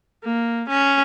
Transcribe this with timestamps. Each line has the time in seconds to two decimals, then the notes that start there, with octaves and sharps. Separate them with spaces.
0.24 A#3
0.70 C#4